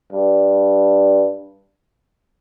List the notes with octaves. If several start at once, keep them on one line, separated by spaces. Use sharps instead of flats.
G2